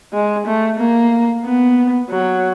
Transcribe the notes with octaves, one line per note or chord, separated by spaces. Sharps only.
G#3
A3
A#3
B3
F#3